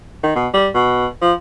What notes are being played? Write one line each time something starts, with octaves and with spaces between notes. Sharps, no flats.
D#3
B2
G3
B2
F3